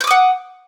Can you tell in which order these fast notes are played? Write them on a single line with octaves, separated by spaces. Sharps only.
G6 D6 D#6 F#5